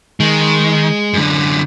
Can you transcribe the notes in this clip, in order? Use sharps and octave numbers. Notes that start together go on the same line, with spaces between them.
D#3 G#3
F#2 D3